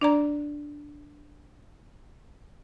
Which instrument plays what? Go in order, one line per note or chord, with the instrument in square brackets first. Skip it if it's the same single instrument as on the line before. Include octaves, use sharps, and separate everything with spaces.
[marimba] D4 D5 A#5